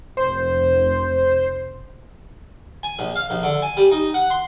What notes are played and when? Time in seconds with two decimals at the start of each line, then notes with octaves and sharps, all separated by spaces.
0.17 F1 C5
2.83 G#5
2.99 A#1
3.16 F5
3.30 A#1
3.43 D3
3.62 G#5
3.77 G3
3.92 D#4
4.14 F#5
4.30 C6